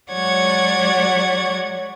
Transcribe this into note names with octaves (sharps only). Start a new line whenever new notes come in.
F#3 G#3 C#5 D5 F#5 G#6